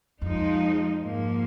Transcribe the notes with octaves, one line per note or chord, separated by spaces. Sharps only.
F2 F3 G#3 D#4
G#2 F3 A#3